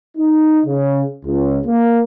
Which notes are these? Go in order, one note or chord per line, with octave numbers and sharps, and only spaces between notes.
D#4
C#3
C#2
A#3